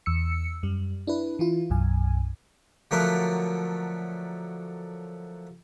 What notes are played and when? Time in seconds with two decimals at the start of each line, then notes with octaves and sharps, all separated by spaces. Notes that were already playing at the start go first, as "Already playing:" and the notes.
0.06 E2 E6 C#7
0.63 F#2 G3
1.07 D4 E4 B4
1.39 E3 E4 F4
1.70 B1 F#2 G#5
2.91 D3 F3 F#3 A3 A#4 B4